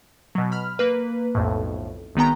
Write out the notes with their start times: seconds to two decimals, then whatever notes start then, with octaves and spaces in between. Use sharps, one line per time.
0.35 B2 F#3
0.52 B5 F6
0.79 A#3 B4
1.35 B1 F2 A2
2.15 G#1 D#3 B3 G5 A#5